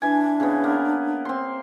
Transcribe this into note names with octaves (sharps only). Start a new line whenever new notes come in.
E3 D4 G#5
C#3 B3
A#3 B3
C4 C6